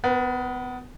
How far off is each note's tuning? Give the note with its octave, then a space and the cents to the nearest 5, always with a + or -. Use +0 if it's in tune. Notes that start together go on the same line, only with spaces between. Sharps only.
B3 +25 B4 -40